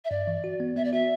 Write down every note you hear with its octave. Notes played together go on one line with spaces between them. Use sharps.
E5
G2 D5
E3
F#4
B3
B3 E5
D5
F#4 E5